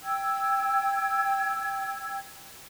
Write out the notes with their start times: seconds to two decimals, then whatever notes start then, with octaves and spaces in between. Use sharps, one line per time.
0.03 G5 E6 G#6